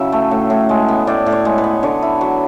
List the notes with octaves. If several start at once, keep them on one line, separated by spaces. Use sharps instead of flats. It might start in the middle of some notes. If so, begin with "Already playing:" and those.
Already playing: C#3 F#3 E4 E5
A3
A2
A2
G#3
B3
A2 D5
A2
C#5
G#3
B4
B3
D3 C#5
E4
F#3